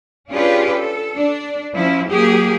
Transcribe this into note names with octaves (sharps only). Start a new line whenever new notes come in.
C#4 D4 F4 G4 G#4 B4
A4
D4
F3 C#4 E4
F#3 A#3 G4 G#4